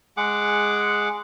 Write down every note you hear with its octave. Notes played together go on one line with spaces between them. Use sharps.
G#3 G#4 F#5 D6